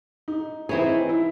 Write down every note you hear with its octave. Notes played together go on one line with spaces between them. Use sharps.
D#4
E3 C4 D#4 E4 G#4 C#5
E4